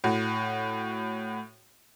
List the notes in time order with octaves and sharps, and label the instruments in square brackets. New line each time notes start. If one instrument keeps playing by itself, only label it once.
[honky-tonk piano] A2 F#4